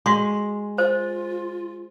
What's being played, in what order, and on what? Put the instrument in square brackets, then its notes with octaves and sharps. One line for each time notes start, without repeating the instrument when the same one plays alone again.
[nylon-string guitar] G#3 [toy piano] F#4 C6 C#6
[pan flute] F4 [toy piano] C5